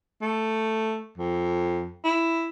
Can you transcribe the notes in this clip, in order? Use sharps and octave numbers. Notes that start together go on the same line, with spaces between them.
A3
F2
E4